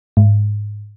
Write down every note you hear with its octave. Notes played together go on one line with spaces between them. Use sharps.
G#2